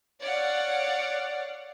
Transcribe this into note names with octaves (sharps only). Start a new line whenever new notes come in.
C#5 D5 F5 F#5